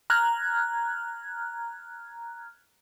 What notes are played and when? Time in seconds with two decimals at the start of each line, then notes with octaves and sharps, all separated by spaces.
0.10 A#5 F6 F#6 G#6